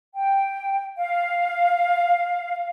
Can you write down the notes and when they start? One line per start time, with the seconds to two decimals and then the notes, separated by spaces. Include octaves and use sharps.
0.15 G5
0.98 F5